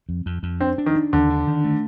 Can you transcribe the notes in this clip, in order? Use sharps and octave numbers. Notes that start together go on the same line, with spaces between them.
F2
F2
F2
C4 D4
D4
D#3
D4
D#2 D3
D4
D#3
A3